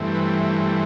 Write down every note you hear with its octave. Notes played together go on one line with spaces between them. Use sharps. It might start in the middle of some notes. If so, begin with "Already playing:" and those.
Already playing: G2 E3 A3 C4
B4